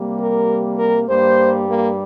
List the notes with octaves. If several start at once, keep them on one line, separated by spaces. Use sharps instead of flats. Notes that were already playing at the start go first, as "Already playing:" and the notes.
Already playing: C3 G3 A#3
A#4
A#4
G2 G3 A#3 C5
A#3